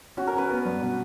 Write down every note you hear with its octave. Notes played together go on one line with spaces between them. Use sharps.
C#4 F#4
A#4
C#4 B4
B3
G2
B2